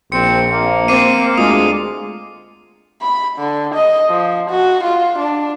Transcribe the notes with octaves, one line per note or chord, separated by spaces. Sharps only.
A#1 C4 C#7
A#3
C4 D6 C7 D#7
D2 G#3 F4 D#6
B5
D3
D#5
F3
F#4
F4
D4